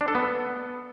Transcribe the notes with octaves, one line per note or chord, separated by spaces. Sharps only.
D4
A4
B3